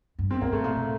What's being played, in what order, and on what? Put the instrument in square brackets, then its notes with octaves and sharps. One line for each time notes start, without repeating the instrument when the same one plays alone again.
[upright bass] G2
[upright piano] C4
[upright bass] A2 [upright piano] A#3
[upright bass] A2 [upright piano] A3
[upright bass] A#2
A#2